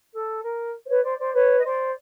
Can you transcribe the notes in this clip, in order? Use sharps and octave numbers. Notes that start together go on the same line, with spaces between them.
A4
A#4
C5
B4 C#5
C5 D5
C5 D5
B4 C#5
D#5
C5 D5